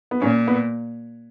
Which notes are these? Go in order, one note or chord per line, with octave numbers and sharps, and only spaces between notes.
B3
A#2 C#4
B3